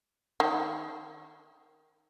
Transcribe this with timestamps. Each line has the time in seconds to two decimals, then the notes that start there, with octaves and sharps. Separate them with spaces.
0.40 D#3